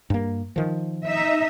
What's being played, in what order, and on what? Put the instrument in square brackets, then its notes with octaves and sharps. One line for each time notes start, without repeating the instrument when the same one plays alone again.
[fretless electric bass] G2 A#3
D#3 F3
[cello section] D#4 E5